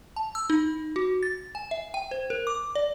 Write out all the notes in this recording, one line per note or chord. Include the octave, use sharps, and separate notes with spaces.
A5
E6
D#4
F#4
A6
G#5
E5
G5
C5
A#4
D6
D5